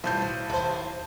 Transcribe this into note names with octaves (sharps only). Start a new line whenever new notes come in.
B1 A2 G3 F4 C5 A5 G6
C5
D#2 E4 A4 C5